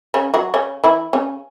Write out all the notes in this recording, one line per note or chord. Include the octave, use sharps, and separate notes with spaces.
C#3 C#4
F#3 F#4
C#3 C#4
E3 E4
C#3 C#4